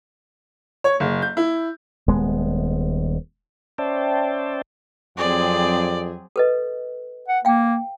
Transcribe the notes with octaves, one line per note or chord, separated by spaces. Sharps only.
C#5
F#1
G6
E4
D#1 G#3 B3
C#4 C5 D5 E5 G5 A5
F2 F#3 C4 G#4 D5
A4 B4 D#5
F#5
A#3 F5 G5